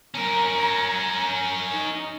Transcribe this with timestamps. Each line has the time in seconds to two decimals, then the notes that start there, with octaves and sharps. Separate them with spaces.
0.15 C#4 A#4 A#5
1.72 D#4